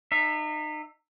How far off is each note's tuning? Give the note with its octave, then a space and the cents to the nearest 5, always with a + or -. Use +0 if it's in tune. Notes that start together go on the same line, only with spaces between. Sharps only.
D#4 -35 E5 +0